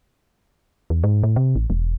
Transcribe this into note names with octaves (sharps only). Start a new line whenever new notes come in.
E2
G#2
A2
C3
A1
E1